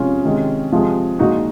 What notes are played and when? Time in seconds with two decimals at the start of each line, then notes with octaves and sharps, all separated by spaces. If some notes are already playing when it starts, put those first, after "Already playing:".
Already playing: C3 F3 G#3 C#4 F4
0.24 C3 D#3 G#3
0.72 C3 F3 G#3
1.19 A#2 F3 G#3 D#4 F#4